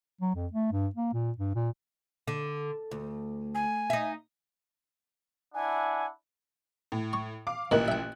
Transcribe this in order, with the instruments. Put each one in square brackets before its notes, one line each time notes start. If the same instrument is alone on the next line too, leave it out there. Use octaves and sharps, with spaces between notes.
[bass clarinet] F#3
F2
A3
G2
A#3
A#2
G2
A#2
[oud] D3
D2
[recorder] G#5
[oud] D#4 E5
[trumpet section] D4 E4 F#5 [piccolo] G#5
[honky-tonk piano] A2
[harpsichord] C#6
[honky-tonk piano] F5 D6
[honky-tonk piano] A1 A#2 F#6 [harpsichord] D#3 E3
[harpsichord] E5 G5